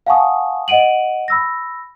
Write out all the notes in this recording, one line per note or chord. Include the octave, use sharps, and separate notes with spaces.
F5 F#5 G#5 A5 C#6 D#6
D#5 F#5 D7 D#7 F#7
B5 E6 A#6